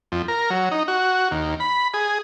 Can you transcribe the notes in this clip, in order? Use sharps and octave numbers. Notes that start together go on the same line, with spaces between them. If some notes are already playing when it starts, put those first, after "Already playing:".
F2
A#4
F#3
D#4
F#4
D#2
B5
G#4